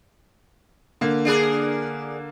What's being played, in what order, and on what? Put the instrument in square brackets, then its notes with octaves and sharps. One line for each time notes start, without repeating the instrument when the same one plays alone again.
[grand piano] D3 A#3
[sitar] D4 G#4 A#4